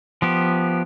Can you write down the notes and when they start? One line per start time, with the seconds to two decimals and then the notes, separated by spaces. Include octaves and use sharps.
0.22 F3 B3 G4